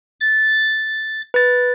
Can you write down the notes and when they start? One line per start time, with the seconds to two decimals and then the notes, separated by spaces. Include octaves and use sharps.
0.20 A6
1.34 B4 A6